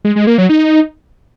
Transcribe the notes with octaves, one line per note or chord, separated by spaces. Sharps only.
G#3
G#3
A#3
F#3
D#4